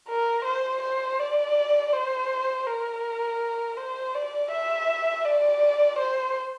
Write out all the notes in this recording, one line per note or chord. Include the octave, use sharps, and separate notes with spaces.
A#4
C5
C5
D5
C5
A#4
C5
D5
E5
D5
C5